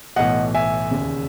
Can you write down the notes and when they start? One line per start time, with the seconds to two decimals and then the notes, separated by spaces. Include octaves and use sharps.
0.16 B1 A2 E3 D#5 F#5
0.54 E5 G#5
0.91 E1 D#2 C#3